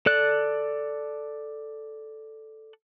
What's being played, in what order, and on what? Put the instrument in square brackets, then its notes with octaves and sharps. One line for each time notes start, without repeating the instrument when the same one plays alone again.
[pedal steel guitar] A4 D5 F#6